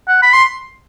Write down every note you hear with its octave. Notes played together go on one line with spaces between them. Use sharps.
F#5
B5
C6